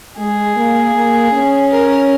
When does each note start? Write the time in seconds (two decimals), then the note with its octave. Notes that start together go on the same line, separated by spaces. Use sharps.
0.18 G#3 G#4
0.56 A#3
0.95 A#3
1.33 C#4
1.71 A#4